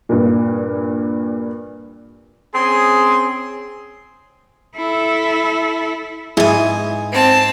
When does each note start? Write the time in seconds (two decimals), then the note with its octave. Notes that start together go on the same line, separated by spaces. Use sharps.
0.09 G2 A#2
2.54 C4 C#4 G#4 C6
4.77 E4 A4
6.37 G#2 E4 G#4 G#5
7.12 C4 A5